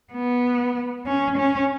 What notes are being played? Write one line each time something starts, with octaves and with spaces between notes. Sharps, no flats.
B3
C#4
C#4